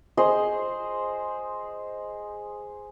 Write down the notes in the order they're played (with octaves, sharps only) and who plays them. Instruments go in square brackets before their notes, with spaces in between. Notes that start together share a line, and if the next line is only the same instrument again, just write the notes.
[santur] G#4 C5 D#5